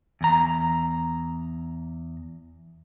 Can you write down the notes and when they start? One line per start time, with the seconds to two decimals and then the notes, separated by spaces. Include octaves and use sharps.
0.21 E2 A#5